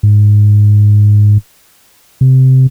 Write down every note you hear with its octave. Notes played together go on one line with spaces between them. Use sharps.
G#2
C3